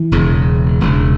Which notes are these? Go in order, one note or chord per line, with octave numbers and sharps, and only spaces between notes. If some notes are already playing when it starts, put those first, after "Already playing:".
Already playing: E3
E1 E2 C#3
E1 E2 C#3